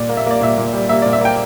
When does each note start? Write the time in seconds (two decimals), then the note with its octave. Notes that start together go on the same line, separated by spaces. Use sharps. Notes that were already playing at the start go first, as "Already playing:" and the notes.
Already playing: A#2 D5
0.09 A#3
0.17 E5
0.26 A#3 D5
0.41 A#2 E5
0.58 A#2
0.73 G3
0.89 A#3 E5
1.02 A#2 D5
1.13 E5
1.21 A#3 G5